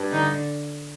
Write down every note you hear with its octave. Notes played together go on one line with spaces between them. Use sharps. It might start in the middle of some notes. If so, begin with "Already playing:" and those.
Already playing: G2
D3 D#4